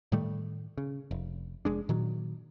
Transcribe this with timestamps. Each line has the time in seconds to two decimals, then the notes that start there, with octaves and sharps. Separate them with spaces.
0.12 A2 D#3 G3 A3
0.78 C#3
1.11 F1
1.65 F1 G#3 D4
1.89 A#2 D#3 F#3